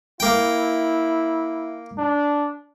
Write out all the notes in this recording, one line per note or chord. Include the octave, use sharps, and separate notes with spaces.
A#3 E4 G5
D4